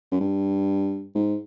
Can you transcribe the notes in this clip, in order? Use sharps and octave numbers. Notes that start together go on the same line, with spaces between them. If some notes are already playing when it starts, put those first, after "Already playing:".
F#2
G2
G#2